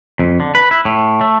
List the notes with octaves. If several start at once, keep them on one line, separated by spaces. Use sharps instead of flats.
F2
D3
B4
E4
A2
A3